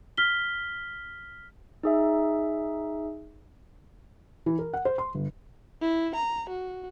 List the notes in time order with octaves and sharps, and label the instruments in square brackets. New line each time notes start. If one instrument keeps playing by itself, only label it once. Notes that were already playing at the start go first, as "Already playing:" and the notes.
[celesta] F6 B6 G7
[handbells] D#4 G#4 E5
[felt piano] E3
A#4
F#5
C5
C6
G1
[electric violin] E4
A#5
F#4